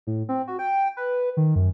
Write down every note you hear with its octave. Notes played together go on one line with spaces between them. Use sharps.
A2
C4
F#4
G5
B4
D#3
F#2